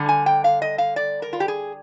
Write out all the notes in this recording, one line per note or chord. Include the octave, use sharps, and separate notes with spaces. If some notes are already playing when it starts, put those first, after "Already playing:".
Already playing: D3 G3
G#5
G5
F5
D#5
F5
D5
A#4
F4
G4
G#4